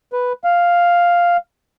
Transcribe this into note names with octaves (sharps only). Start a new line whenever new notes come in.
B4
F5